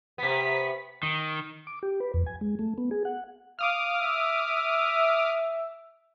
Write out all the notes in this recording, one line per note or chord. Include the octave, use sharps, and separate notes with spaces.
C3 B3 B6
D#3
D6
G4
B4
F2
G#5
G#3
A3
B3
G#4
F#5
F5 D6 D#6 F6
E5